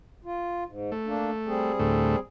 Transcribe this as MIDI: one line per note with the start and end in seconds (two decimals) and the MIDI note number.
0.25 0.64 65
0.66 0.91 44
0.92 1.73 57
1.06 1.30 58
1.06 1.30 62
1.46 2.19 55
1.46 2.19 60
1.46 2.19 68
1.80 2.16 38
1.80 2.16 45
1.80 2.16 57